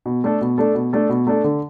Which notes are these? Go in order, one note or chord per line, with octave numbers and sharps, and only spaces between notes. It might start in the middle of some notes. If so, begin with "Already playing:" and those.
B2
A3 D4 A4
B2
A3 D4 A4
B2
A3 D4 A4
B2
A3 D4 A4
D3